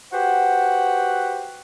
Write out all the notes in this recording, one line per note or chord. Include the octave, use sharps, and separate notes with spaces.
F#4 G4 B4 C5 F#5